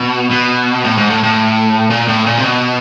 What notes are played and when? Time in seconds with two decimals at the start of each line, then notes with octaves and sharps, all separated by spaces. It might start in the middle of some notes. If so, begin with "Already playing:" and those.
Already playing: B2
0.30 B2
0.84 A2
0.97 G#2
1.10 A2
1.23 A2
1.90 A#2
2.08 A2
2.26 A#2
2.38 C3
2.44 B2